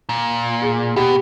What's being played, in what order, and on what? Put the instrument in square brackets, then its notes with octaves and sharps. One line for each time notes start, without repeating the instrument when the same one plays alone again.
[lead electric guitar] A#2
[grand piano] G#4
[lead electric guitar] B2 [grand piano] G4